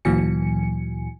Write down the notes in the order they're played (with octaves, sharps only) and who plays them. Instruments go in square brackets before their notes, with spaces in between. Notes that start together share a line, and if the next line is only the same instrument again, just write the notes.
[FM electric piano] D2 A#2 E3 F#3 G#5 C#7